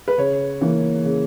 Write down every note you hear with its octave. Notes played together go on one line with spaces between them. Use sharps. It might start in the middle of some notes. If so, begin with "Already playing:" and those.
B4
C#3 C#5
E3 A#3
C#3